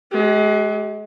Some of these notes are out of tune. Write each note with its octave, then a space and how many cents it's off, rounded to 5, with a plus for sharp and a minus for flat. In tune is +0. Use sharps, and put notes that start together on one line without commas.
G#3 +35 G4 -25